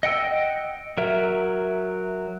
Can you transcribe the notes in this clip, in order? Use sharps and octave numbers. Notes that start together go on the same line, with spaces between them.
D#5 F#5 G5 E6
F#3 A#4 E5